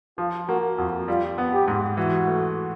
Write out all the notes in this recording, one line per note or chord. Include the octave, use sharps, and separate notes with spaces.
F3 F4
A#3 F#4
F2 F#4
G3 F4
B3
G4
G#2
E3 F#4
A3